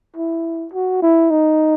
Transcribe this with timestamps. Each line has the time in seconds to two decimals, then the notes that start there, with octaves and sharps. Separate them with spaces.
0.16 E4
0.73 F#4
1.02 E4
1.31 D#4